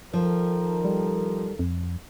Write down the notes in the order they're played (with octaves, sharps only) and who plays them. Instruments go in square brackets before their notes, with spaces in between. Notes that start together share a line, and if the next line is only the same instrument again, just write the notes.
[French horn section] D#3 A4 A#4 [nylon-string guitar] F3
[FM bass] G3
F2